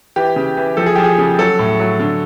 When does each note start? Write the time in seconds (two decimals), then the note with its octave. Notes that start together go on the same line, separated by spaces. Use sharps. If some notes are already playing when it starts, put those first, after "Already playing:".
0.16 E3 G4
0.36 C#3
0.57 E3
0.77 F3 A4
0.86 G#4
0.95 F3 G4
1.04 G#4
1.18 C#3
1.39 F#3 A4
1.59 A2
1.80 F#3
2.00 D3